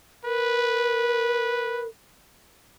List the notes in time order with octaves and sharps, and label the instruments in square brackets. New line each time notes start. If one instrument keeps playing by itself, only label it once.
[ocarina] A#4 [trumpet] B4